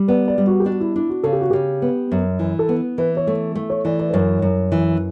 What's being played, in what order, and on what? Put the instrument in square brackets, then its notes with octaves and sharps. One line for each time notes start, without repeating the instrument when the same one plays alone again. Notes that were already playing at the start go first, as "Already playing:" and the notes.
Already playing: [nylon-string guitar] G3
[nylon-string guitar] B3 [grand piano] D5
[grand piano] D5
[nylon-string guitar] G3
[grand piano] F#4
G4
[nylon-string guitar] D4 [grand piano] F#4
[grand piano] E4
[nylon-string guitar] D4 [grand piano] E4
[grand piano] F#4
[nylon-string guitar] C#3 [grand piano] A4
[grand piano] G4
F#4
[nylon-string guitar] C#3 [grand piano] G4
[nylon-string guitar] B3
F#2
E3
[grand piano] A4
[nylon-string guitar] B3
[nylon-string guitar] E3 [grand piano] B4
[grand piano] C#5
[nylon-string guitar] A3
A3
[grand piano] C#5
[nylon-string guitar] E3 [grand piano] D5
[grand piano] D5
B4
[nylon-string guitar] F#2 [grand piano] C#5
[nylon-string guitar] F#2
E3